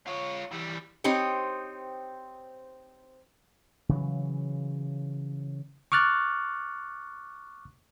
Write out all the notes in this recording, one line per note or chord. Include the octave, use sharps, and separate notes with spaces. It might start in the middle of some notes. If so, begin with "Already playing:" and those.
F4 C#5
E3 G3
C4 D#4 G4 C5 C#5
C#3 E3 F#3
C#6 D6 F6 F#6 A6